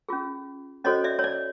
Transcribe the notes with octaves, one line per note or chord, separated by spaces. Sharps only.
C#4 F4 G#4
C#4 F#4 A4 C5 C#5 D#5
D5 E5
C#5
D5